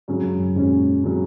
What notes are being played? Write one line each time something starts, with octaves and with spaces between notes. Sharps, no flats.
G#2 C#3 F#3 C#4
F#2
F#2
G#2 C#3 F#3 C#4
A#2
G#2
C#3 F#3 C#4